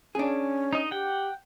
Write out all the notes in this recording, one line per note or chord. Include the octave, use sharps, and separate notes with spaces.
C#4 D4 G#4
D#4 D#5
G4 F#5 G5